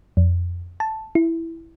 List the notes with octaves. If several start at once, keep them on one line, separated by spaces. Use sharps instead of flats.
F2
A5
E4